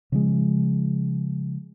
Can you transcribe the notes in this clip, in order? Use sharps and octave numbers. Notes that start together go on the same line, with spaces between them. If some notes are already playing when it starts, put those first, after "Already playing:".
C#3 F3 G#3